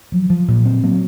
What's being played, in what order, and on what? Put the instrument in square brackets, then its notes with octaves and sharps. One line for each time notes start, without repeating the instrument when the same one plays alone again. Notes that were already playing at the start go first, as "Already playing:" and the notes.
[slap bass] F3 [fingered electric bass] F#3
[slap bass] F3
A#2
C4
[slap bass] F#3 [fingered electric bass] A#3